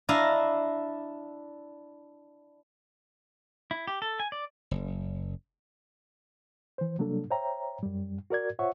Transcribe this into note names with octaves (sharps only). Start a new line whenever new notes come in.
D4 E4 D#5 F5 A#5
E4
G4
A4
G#5
D5
F#1
E3 C5
C3 F#3 G3 A#3 D4 A4
C5 C#5 E5 G5 A#5
F#2 G3
F#4 A#4 D5 G#6
F4 C5 C#5 E5 F#5 C#6